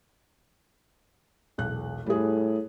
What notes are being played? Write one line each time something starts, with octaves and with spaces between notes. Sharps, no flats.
E1 B1 F#6
A2 G3 G#4